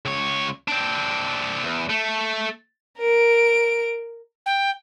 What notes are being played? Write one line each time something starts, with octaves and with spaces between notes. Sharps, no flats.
C#2 C#5
C4 D4
E2
A3
A#4 D7
G5